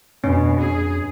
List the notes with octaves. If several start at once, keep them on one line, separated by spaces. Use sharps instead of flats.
F2 B2 C#4 D4
G#4